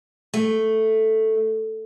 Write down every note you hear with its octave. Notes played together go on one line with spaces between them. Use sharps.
A3